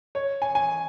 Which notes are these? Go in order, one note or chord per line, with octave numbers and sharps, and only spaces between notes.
C#5
G#5
G#5